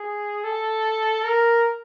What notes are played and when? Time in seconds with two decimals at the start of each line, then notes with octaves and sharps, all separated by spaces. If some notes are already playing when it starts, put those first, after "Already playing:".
Already playing: G#4
0.44 A4
1.23 A#4